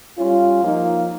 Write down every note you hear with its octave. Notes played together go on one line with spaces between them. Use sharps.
G3 C#4 F4
F3 A#3 D#4